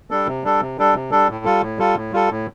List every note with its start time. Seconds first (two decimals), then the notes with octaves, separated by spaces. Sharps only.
0.11 G3 D4 A4
0.27 C3
0.44 G3 D4 A4
0.60 C3
0.78 G3 D4 A4
0.94 C3
1.11 G3 D4 A4
1.29 A2
1.45 G3 F4 A4
1.62 A2
1.78 G3 F4 A4
1.96 A2
2.12 G3 F4 A4
2.30 A2